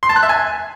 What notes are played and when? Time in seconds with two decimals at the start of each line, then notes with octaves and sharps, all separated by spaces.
0.03 C6
0.09 A5
0.16 F#6
0.23 E5
0.29 G#5